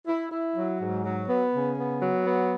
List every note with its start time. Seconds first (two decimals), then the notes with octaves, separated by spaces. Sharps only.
0.07 E4
0.31 E4
0.56 F#3
0.80 G#2
1.04 F#3
1.28 B3
1.53 C#3
1.78 B3
2.01 F#3
2.26 B3